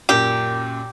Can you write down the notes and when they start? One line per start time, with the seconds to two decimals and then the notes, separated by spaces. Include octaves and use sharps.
0.09 F#2 A#2 G4